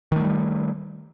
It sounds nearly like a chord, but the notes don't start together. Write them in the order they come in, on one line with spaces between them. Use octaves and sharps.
D#3 A3 F#3 G3